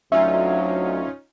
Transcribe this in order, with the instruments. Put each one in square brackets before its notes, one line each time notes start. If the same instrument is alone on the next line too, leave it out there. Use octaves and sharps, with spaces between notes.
[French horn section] D2 F#3 [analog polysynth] C#4 D#4 F4 [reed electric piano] E5